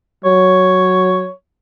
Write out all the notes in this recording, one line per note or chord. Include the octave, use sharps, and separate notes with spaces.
F#3 C#5